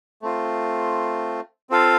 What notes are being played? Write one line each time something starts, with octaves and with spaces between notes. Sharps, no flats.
A3 C4 F4
C4 F4 A4 F5